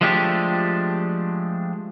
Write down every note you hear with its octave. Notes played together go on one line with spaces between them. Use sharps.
F3 G#3 A3 D4 G4